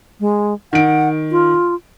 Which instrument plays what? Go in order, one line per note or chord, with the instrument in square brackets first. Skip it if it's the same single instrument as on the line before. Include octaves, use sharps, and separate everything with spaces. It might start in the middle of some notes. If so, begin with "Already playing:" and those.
[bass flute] G#3
[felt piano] D#3 D7 [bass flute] F#5
[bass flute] F4